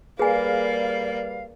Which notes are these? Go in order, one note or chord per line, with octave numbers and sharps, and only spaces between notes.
G3 A#3 G#4 B4 D5 F5 G#5